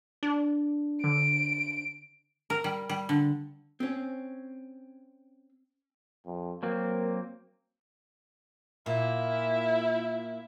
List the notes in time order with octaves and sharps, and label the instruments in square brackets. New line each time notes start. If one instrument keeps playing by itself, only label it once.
[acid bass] D4
[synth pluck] D3 [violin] D7
[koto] A#4
G3
G3
D3
[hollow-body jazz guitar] C4 C#4
[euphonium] F2
[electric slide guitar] F#3 A#3 C4 [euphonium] A#4
[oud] A#2 [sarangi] E4